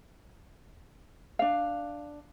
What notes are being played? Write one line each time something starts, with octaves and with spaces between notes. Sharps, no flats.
D4 F5